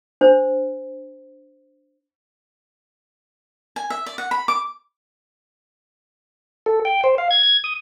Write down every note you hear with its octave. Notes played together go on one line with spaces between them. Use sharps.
D4 C5
G#5
E5
D5
F#5
B5
D6
A4
G5
C5
F5
G#6
G#6
D#6